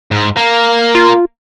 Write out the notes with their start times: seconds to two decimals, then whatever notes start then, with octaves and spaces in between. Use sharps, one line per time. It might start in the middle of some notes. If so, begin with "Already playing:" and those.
0.11 G#2
0.37 A#3
0.95 F4